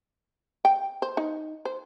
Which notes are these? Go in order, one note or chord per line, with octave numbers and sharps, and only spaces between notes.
G5
C5
D#4
C5